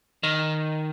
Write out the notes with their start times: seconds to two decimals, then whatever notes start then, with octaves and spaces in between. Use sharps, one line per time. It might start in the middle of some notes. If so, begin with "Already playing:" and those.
0.23 D#3